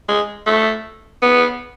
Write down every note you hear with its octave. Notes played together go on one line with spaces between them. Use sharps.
G#3
A3
B3